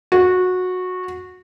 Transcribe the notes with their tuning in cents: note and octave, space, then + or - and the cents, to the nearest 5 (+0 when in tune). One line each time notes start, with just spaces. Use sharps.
F#4 -15